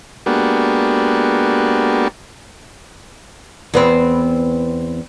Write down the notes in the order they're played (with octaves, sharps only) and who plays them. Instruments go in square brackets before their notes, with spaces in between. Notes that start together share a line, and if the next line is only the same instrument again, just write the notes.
[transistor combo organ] G#3 A#3 B3 D4 F#4 G4
[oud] E2 B3 C4